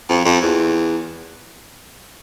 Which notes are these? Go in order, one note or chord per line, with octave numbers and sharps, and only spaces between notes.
F2
F2
E2